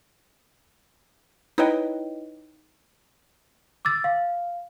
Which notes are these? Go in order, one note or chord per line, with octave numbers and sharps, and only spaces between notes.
D#4 E4 B4 C#5 D#5 G5
D6 E6 A6
F5